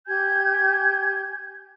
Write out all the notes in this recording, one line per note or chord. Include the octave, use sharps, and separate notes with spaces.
G4 G#5 G6 G#6